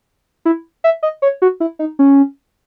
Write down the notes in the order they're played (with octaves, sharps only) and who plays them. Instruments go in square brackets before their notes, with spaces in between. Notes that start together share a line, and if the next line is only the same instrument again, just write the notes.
[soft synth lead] E4
E5
D#5
C#5
F#4
E4
D#4
C#4